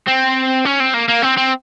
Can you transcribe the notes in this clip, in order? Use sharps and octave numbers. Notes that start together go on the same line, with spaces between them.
C4
C#4
C4
A#3
A#3
C4
C4